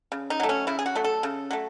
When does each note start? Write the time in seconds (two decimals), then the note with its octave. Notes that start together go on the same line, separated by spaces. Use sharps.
0.12 C#3
0.30 D#4
0.40 F#3 A3
0.49 C#4
0.67 C#3 E4
0.79 G#4
0.86 F#4
0.95 F#3 A3
1.04 A4
1.23 C#3
1.51 F#3 A3